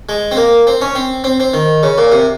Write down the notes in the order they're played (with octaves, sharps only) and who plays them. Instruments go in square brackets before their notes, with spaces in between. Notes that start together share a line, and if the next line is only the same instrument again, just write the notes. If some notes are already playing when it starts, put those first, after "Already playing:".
[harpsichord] G#3
C4
A#3
C4
C#4
C4
C4
C4
D#3
C#3
A#2
C3